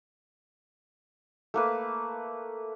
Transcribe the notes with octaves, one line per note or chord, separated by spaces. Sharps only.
A3 A#3 B4